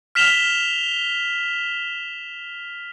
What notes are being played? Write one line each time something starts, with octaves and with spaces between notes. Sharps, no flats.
F6 B6 E7 F7 G7